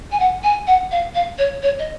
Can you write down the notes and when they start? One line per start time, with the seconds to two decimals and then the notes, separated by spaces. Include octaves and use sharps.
0.11 G#5
0.19 F#5
0.43 G#5
0.67 F#5
0.91 F5
1.15 F5
1.38 C#5
1.62 C#5
1.79 D#5